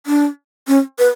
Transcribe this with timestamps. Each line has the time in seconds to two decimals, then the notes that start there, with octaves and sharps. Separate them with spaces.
0.06 D4
0.68 C#4
0.99 B4